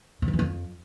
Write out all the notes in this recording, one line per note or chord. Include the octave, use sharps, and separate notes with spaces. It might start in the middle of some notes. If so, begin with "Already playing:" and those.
D3
D#3
E3
F2